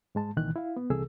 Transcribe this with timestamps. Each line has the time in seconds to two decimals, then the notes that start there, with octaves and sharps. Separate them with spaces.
0.15 G#2 G#3 A5
0.37 C2 A#2 D#3 E3 F#6
0.56 E4 F5
0.76 B3
0.90 C2 C3 E3 G#4 A4 E6